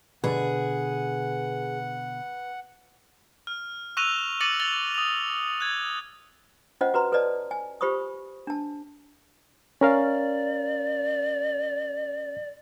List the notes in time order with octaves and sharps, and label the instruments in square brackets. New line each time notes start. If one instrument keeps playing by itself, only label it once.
[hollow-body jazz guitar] B2 D3 A5 [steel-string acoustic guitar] G#4 [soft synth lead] B4 [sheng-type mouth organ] F#5
[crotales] F6
C#6 E6 F#6 A#6 D#7 F7
D6 A6 A#6 C#7 D#7 F#7
A6 F7 G7
D#6 F7
F#6 G#6
[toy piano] C#4 F4 C5 D#5 F#5
F#4 B4 A#5 C6
A4 B4 C5 D5 D#5 A5
G#5
F4 G4 C5 B5 C#6 D#6
D4 A5
[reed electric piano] C#4 A#4 F5 [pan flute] D5